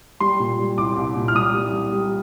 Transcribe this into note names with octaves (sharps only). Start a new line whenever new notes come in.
G3 C6
A#2
G3
C2 D6
C2
A#2
F6
G3 D#6
G3
G3
G3